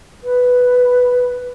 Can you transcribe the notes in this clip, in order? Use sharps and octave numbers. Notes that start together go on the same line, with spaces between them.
B4